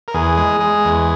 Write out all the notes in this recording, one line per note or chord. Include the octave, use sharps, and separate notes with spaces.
A#4
E2 G#4
G#3
G#3
E2